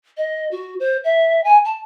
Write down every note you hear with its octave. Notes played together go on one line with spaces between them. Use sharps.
D#5
F#4
C5
E5
G#5
A5